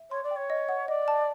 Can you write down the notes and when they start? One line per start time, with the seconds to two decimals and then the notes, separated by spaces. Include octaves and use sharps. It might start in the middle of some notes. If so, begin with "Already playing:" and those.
Already playing: E5
0.11 C#5 C6
0.23 D5
0.31 G5
0.36 C#5
0.50 D#5
0.69 F#5
0.88 D5 D#5
1.08 A5